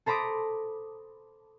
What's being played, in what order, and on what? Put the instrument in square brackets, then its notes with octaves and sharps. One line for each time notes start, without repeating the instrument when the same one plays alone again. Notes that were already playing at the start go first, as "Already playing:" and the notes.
[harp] A4 C5 A#5 B5 D6 D#6